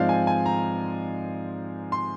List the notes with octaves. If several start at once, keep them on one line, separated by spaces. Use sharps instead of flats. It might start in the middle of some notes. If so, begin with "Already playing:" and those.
Already playing: G#2 F3 G#3 C4 D5 F5
G#5
G#5
A#5
C6